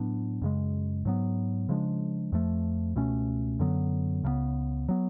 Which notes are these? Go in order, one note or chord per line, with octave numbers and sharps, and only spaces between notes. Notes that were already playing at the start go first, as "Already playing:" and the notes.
Already playing: A2 F#3 B3 D4
F#2 C#3 G#3
G#2 F#3 B3
C#3 F3 G#3 D4
F2 F3 A3
C#2 B2 A3 C#4
F#2 D3 F#3 B3
C#2 C#3 F3 B3
F#3 B3